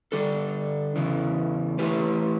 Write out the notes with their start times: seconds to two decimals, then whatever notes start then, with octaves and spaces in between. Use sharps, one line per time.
0.12 D3 G3 D4 A4
0.96 E2 C#3 E3
1.79 E3 A3 E4 G4 B4